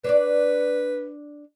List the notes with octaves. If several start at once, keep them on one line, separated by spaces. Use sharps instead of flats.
D4 B4 C#5 D5